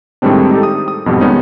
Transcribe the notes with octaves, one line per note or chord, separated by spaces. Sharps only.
A2 D#3 G3 G#3 C4 D4
D#4 G4 A4
D#6
D#6
F2 G#2 B2 G3
D#3 G3 G#3 B3 C#4 D#4